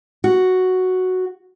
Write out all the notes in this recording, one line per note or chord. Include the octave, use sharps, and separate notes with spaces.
F#4